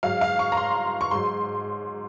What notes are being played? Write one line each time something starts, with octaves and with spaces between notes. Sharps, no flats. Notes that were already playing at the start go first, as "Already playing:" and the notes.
G#2 F#3 F5
F5
C#6
A#5
C6
C#6
G#2 F#3 C6